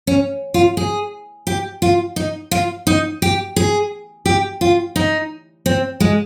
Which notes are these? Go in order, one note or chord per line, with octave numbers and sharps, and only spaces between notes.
C#4
F4
G#4
G4
F4
D#4
F4
D#4
G4
G#4
G4
F4
D#4
C4
G#3